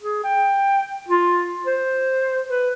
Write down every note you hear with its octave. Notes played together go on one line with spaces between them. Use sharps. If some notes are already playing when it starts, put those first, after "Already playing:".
G#4
G5
F4
C5
B4